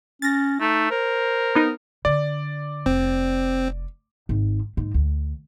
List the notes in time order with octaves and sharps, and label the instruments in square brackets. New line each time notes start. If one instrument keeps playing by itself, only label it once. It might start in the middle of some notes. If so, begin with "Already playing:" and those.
[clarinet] C#4 [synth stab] A6 A#6
[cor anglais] A3 [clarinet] D#4
[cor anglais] A#4 [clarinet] C5
[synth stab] B3 D#4
[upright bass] D3 [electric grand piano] D5
[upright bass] F1 [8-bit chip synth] C4
[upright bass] G#1
G#2
D2